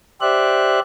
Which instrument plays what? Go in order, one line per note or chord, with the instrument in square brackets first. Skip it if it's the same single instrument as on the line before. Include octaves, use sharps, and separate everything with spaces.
[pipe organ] G4 C5 D5 E5 F#6